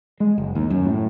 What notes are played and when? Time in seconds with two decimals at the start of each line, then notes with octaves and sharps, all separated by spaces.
0.20 G#3
0.38 F#1
0.55 D#2
0.70 F#2
0.86 A2